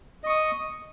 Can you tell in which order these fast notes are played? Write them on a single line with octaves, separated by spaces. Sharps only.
D#5 C#6 D#6